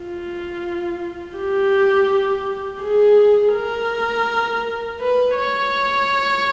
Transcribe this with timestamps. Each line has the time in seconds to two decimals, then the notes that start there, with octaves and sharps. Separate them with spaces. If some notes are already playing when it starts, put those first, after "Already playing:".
Already playing: F4
1.37 G4
2.82 G#4
3.55 A#4
5.00 B4
5.37 C#5